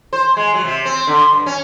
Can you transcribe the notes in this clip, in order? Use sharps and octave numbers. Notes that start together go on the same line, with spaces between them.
C5
G#3
F#3
C3
C4
D3
G2
C#4